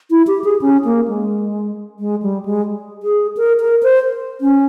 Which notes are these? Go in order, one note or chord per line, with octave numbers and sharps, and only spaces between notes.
E4
G4
G#4
C#4
A#3
G#3
G#3
G3
G#3
G#4
A#4
A#4
C5
C#4